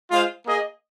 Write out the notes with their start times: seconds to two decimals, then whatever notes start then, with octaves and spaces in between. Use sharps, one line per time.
0.11 G#3 F4 C5 F5
0.46 A#3 G#4 D#5